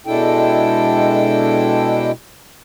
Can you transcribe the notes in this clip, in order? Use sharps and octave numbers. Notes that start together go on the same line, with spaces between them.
B2 G#3 D4 E4 A4 G5